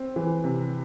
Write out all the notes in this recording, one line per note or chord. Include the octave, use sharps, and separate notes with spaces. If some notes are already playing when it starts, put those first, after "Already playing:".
Already playing: C4
E3
C3